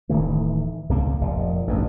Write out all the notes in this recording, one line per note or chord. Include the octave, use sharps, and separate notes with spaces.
D1 D#3 E3 A3
C#2 C3 A#3
F1 A#2
A1 G2 B2